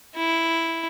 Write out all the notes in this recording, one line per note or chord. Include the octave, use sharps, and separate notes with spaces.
E4